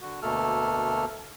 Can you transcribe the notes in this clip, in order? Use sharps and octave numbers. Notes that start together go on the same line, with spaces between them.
D3 F#4
D2 B2 A3 A#3 A4 F6